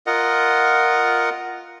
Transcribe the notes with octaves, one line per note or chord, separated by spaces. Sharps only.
F4 A#4 D#5 F#5